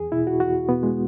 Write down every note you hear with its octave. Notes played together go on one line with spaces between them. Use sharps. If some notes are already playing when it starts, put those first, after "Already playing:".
Already playing: E2 G#4
B2 E4
F#4
E2 F#4
B2 B3
G#3